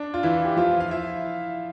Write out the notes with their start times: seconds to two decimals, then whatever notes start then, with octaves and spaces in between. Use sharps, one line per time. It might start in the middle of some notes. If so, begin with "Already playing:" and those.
Already playing: D4
0.14 F4
0.23 E3 E4
0.45 G4
0.57 F3 F4
0.80 F5
0.91 E4 E5